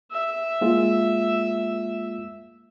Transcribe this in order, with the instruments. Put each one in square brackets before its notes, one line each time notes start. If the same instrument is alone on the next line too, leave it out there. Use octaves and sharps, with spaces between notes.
[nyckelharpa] E5
[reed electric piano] G#3 A#3 F4